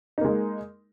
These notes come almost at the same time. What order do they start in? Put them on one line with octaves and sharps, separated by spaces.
D#4 A#3 G#3